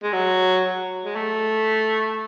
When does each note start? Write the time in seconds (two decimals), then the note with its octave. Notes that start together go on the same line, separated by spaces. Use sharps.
0.03 G#3
0.13 F#3
1.05 G#3
1.15 A3